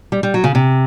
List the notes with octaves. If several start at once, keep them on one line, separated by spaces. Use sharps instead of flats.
G3
G3
F#3
C#3
C3